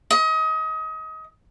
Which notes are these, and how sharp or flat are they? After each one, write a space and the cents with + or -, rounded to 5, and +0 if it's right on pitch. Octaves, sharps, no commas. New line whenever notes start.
D#5 +30